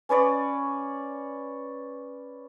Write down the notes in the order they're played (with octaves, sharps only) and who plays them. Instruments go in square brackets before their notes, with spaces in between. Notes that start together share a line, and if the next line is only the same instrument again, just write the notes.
[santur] C#4 B4 C#5 D5